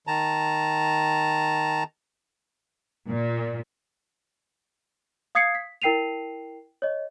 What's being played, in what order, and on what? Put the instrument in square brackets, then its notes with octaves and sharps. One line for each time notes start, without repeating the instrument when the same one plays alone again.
[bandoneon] D#3 A5 A#5
[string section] A#2
[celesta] F5 D#6 G#6 C7 C#7
B6
E4 A#4 G5 C7 D#7 F7
C#5 D#5